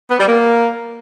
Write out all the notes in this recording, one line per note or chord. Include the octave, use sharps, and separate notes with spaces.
B3
G3
A#3